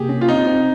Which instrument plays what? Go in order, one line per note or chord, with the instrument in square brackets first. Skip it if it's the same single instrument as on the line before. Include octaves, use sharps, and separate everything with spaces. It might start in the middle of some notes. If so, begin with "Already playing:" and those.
Already playing: [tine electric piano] C3 A#3 [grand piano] G4 G#4
[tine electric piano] C#4
[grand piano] F4
[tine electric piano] C4 [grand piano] D#4
[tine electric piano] C4